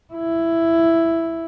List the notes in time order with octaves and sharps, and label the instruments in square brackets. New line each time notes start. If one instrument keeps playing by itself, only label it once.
[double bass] E4